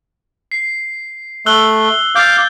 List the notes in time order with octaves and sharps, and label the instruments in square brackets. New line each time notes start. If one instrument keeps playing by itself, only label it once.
[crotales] C7
[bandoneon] A3 [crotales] E6 F#6 G7
[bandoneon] F5 D6 [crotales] G6 A6